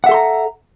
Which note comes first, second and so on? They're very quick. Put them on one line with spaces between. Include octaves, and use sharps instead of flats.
F#5 E5 A4 C6 A#5